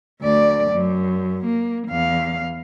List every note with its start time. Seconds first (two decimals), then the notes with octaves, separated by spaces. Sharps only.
0.22 D2 D5
0.72 F#2
1.45 A#3
1.88 E2 F5